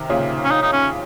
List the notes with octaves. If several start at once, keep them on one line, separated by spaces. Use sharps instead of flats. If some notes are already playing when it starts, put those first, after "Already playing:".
Already playing: C3 D#3
A#2 C#3
C#4
D#4
D#4
C#4